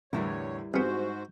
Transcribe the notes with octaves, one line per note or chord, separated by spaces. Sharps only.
E2 A2 D3 G3 E4 A#4 C#5
C2 G#2 B3 F#4 G#4 C5 F6 G6